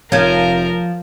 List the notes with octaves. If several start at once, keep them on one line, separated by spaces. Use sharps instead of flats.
F1 F3 A#4 C#5 G#6